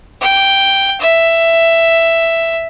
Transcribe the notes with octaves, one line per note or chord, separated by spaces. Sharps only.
G5
E5